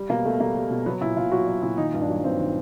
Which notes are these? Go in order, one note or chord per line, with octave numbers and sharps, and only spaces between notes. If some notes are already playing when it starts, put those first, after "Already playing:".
Already playing: G3
B2 A#3
B2 A3
G3 A#3
G3
B2
F#3 B3
A#2 E4
A#2 F4
F#3 F#4
F#3
A#2 E4
D#3 D#4
G2
D4
F#3
G2 C4
D#3